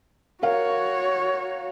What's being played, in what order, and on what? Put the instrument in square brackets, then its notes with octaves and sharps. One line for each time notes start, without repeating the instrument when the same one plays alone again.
[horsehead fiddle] F#4 C#5 [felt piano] A#4 F5